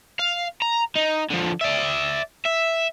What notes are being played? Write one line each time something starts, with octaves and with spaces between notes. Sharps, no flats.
F5
A#5
D#4
D3 F3
D5 E5
E5